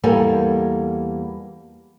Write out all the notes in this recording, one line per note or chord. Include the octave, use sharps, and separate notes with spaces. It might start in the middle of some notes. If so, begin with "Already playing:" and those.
E2 G3 A#3 A4 G#5